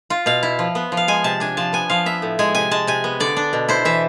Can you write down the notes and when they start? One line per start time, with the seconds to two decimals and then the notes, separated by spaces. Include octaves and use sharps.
0.10 F4
0.26 B2 F5
0.43 E4
0.59 F3
0.75 B3
0.92 F3
0.97 F5
1.08 G#3 G#5
1.24 C3 A5
1.40 D4 G#5
1.57 F3 A5
1.73 B3 G#5
1.90 F3 F5
2.06 B3 E5
2.22 A2
2.39 G#3 G#5
2.55 C3 G#5
2.71 G#3 A5
2.87 C3 G#5
3.04 B3
3.20 D3 D5
3.37 D4
3.53 B2
3.69 E4 C5
3.85 E3 E5